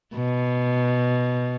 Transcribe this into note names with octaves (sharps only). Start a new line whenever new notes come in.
B2